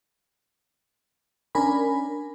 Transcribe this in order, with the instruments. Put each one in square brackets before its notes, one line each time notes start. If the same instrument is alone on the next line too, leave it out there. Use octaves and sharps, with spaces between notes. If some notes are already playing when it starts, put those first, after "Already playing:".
[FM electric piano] C#4 D4 A#4 G#5 B5